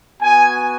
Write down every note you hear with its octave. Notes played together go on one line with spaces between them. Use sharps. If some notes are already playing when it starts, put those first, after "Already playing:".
B3 F#4 G#5